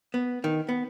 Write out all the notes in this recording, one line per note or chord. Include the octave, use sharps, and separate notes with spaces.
B3
D#3
B3